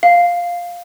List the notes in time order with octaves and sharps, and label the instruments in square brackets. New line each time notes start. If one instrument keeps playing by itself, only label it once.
[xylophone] F5